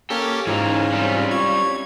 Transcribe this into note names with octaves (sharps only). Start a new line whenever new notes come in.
A#3 C#4 G4 A4
G#2 E3 C#4 D#4 F4
G3 C4
C#5 G#6